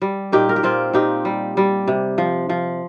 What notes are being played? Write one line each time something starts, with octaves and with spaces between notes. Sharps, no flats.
G3
A#2 D#4 G4
A#4
G4
A#2 C4 F4
A#2 D#4 G4
G3
G3
C3
F3
F3